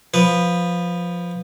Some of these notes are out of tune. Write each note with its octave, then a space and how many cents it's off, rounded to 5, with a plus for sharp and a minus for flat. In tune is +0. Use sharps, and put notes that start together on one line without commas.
F3 +10 B4 +0